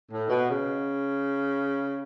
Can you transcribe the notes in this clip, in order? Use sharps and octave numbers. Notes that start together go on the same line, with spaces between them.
A2
B2
C#3